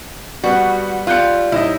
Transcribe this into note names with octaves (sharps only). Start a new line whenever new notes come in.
G3 B3 F#4
G3 F4 F#6 G6 C#7
D#1 D#4 E4 D#5